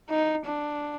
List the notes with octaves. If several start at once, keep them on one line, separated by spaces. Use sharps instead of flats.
D#4
D4